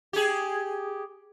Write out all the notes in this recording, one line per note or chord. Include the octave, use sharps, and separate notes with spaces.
G4 G#4